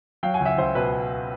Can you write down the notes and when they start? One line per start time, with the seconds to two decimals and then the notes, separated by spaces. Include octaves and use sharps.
0.23 F#3 F5 G5
0.34 F#5 G#5
0.40 C#2
0.45 E5 F#5
0.58 C#2 C5
0.75 B2 B4